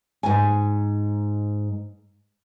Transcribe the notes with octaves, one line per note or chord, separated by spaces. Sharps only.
G#2 G#5